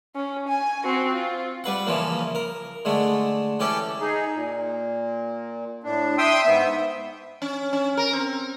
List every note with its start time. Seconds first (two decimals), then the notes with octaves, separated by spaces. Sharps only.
0.15 C#4
0.48 G#5
0.85 C4 F#4
1.13 F4
1.64 G3 B4 F#5
1.86 C#3 E3 F3 A#3
2.35 A#4
2.85 D3 G#3 A3
3.60 E3 C#4 G4 A4
4.01 D#4 G#4
4.34 A#2
5.84 A2 D4
6.18 E5 G5 C6 D#6 E6
6.45 G#2 B3 E5
7.42 C#4
7.73 C#4
7.97 A#4
8.13 C4